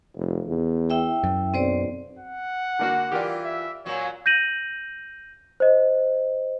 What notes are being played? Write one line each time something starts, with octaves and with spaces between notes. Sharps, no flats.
F1
E2
E4 E5 G5
F#2
B1 C4 C5 D5
F#5
D3 A#3 F#4
E3 F4 G4 A#4 D5
E5
A#2 F#3 C4 C#5
G6 A#6 D#7 F#7
C5 D#5